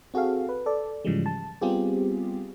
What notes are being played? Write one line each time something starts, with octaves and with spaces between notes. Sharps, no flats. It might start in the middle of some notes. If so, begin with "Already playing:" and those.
C4 F#4 G#4 A4 F5
B4
A4 D5
G#2 C#3 E3 F3 G3 G#3
A5
G3 B3 C4 F4 G4 G#4